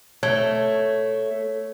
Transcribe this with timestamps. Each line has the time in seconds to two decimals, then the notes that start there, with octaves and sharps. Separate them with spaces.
0.23 A3 C#5